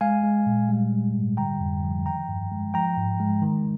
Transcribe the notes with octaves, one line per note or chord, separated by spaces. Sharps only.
G#3 F5 G#5
G#3
A#2
G3
G3
G#2
D3 G5 A#5
F2
F3
D#3 G5 A#5
G2
G#3
F3 G5 A#5
G#2
G#3
D#3